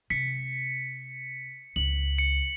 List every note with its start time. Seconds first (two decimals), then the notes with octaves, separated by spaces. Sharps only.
0.10 C3 B6 C#7
1.76 C#2 F#7
2.18 C#7